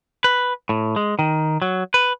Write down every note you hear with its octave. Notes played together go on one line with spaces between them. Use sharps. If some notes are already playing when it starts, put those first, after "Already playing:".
B4
A2
G#3
D#3
F#3
B4